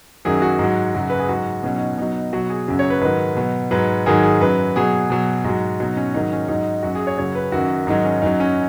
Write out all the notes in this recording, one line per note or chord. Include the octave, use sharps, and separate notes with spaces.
F#2 D#3 F#3 G#4
F#4
G#2 F#3
F#2 C#3 F#3
B4
G#4
G#2 F#3 F#4
B2 F#3 C#4
D#4
B2 F#3 D#4
B2 F#3 F#4
G#4
F#2 C#3 F#3
C#5
B4
G#2 D#3 F#3 B4
B2 F#3
G#2 F#3 B4
G#2 D#3 F#3 G#4
G#4
F#2 F#3 B4
B2 F#3 G#4
B2 F#3
G#2 F#3 F#4
B2 F#3 D#4
C#4
G#2 D#3 F#3 D#4
C#4
G#2 F#3 D#4
F#2 F#3 F#4
G#4
C#5
F#2 C#3 F#3 C#5
B4
F#2 D#3 F#3 F#4
G#2 D#3 F#3 D#4
C#4
F#2 F#3 D#4
C#4